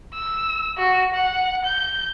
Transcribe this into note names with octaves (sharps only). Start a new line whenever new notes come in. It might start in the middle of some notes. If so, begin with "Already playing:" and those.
E6
F#4
F#5
G6